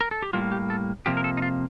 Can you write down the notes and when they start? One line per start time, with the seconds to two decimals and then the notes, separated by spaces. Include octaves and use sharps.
0.01 A#4
0.11 A4
0.22 G4
0.33 A2 G3 A#3 F4
0.52 G4
0.70 A4
1.06 F2 C3 F3 A#3 G4
1.17 A#4
1.24 A4
1.37 D#4
1.42 F4